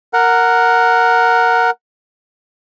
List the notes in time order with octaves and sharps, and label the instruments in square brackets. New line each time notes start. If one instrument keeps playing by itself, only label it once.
[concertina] A#4 F#5